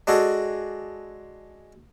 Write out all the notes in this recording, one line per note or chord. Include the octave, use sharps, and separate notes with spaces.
G#3 D4 F#4 G#4 A4